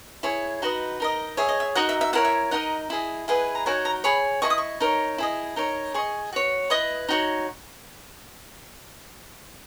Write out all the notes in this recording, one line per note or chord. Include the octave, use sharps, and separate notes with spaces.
E4 G#4 C#5
D#4 F#4 B4 D#5
D#4 A#4 D#5
G#4 C#5 E5
D#5
E5
D#4 F#4 A#4 D#5 F#5
E5
E5
E4 A#4 C#5 F#5
E5
D#4 A#4 D#5 F#5
E4 G#4 D#5
E4 G#4 B4 D#5 F#5
A#5
D#4 F#4 A#4 C#5 G#5
A#5
G#4 C#5 B5
E4 G#4 D#5 C#6
D#6
C#6
D#4 A#4 C#5
E4 G#4 D#5
D#4 A#4 C#5
G#4 D#5 C#6
F#4 C#5
E4 B4 D#5 D#6
D#4 F#4 C#5